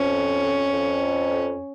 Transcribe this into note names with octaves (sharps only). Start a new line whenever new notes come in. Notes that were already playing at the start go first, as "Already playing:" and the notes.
Already playing: F2 C#4
F2